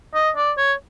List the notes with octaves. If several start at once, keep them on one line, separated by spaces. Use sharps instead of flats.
D#5
D5
C#5